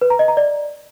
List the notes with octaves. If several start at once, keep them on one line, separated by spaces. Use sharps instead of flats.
B4
A#5
D#5
A#5
D5